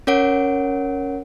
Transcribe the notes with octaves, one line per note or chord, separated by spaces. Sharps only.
C#4 A#4 C#5 F#5 D7